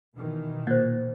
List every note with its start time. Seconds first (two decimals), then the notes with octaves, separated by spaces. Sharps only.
0.15 B2 D#3 E3
0.67 A#2 C5 F#5